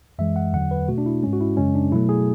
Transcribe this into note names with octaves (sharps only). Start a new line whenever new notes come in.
F#2 E3 G#3 E5
F#5
E2 D3 F#3 F#5
B4
B2 A3 F#4
D4
E4
G#2 G#3 C#4
F#4
E4
F#2 C#3 G#3 C#4
D4
B2 F#3 A3 E4
G#4